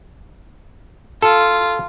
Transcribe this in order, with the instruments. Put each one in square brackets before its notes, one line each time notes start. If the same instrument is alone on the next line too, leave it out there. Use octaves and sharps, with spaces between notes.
[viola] F4 [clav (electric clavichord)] A4